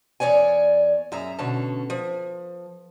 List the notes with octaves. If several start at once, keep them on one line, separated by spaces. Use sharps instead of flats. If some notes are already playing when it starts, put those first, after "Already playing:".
E2 D#3 C#5 D5 G#5
F#2 G#4 E5 A#5
B2 D3 C#4 A5
F3